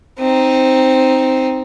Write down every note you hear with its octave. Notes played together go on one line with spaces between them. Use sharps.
C4 D#4